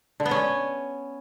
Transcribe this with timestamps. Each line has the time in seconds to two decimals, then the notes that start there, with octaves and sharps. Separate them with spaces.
0.20 D3
0.25 B3
0.31 C#4